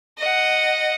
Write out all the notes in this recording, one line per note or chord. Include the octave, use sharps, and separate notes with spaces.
D#5 F#5